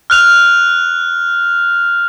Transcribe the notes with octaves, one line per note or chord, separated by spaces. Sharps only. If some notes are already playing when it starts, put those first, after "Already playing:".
F6 F#6 F7